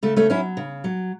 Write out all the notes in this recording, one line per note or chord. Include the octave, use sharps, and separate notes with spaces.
C#3 A3
A3 C#4
F#3 C#4 E4
C#3
F#3